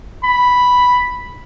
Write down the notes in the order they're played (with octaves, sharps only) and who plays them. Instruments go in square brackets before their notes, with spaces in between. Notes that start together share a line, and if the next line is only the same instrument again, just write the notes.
[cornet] B5